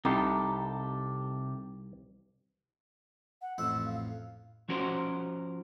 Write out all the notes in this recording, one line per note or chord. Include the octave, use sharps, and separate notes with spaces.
C2 C3 D#4 G4 A4
F#5
A1 F2 F#5 E6
F5
F3 C#4 F#4 A#4 C5